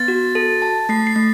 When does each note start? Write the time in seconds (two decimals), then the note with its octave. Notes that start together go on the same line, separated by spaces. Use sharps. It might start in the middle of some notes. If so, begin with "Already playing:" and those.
Already playing: B3 A6
0.08 F#4
0.35 A4
0.62 A5
0.89 A3 C7
1.07 C7
1.16 A3